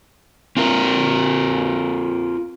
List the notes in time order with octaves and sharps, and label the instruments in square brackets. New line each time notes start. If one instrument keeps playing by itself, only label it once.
[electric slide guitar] C4 F4 A#4